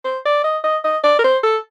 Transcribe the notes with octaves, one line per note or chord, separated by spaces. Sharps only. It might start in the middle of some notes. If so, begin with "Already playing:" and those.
C5
D5
D#5
D#5
D#5
D5
A#4
C5
A4